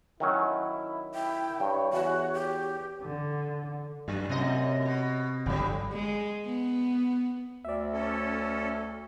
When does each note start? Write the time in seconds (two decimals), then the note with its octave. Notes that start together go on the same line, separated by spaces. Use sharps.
0.20 D#3 F#3 C#4 E4
1.14 E4 G5
1.60 G2 C#5
1.93 E2 F#4
2.33 G4
3.02 D3
4.08 G2 F#3
4.30 F#2 A2 C3 D#5
4.85 B2
5.46 G1 D3 F3 G3
5.93 G#3
6.46 B3
7.65 D2 D5 E5
7.93 C#4 A4